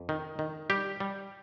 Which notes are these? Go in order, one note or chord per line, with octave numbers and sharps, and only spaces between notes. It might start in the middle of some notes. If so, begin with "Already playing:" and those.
Already playing: F2
D#3
D#3
G3 G4
G3